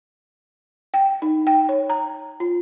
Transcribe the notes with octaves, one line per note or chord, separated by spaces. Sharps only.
G5
D#4
G5
C#5
A#5
F4